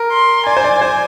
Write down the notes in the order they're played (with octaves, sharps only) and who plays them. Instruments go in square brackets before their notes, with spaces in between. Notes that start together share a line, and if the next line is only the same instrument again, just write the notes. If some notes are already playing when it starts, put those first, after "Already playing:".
Already playing: [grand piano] A#4
[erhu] C6
[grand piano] D5 [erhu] G#5
[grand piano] C5
D5
C5